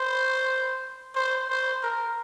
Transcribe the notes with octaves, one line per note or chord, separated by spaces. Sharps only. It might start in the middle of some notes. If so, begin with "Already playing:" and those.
Already playing: C5
C5
C5
A#4